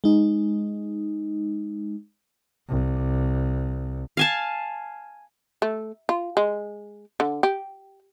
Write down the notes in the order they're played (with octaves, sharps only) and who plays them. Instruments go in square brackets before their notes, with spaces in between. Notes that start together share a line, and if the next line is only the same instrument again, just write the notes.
[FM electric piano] G#3 D#4
[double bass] C2
[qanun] F5 G#5 A5
[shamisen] A3
F4
G#3
D3
G4